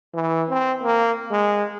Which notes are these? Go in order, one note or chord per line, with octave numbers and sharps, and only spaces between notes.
E3
C4
A#3
G#3